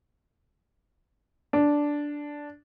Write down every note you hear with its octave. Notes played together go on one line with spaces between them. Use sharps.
D4